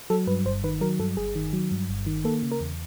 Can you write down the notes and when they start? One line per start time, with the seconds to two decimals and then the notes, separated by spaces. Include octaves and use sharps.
0.10 F#3 A4
0.27 G2 B4
0.45 G1 C5
0.64 D#3 B4
0.81 F#3 A#4
0.99 G2 A4
1.17 G1 G#4
1.35 D#3
1.53 F#3
1.71 G2
1.89 G1
2.06 D#3
2.25 A#3 A4
2.43 C#3
2.51 A#4
2.60 E2